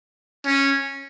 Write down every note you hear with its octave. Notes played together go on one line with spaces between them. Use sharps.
C#4